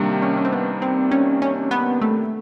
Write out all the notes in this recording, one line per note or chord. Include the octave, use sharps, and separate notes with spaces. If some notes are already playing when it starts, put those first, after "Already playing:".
Already playing: C3 D#3 G3 A#3 D4
C#4
C#4
C4
B3
C4
C#4
C#4
B3
A3